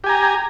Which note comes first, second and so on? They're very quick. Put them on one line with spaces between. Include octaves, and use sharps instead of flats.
G4 G#5 A#5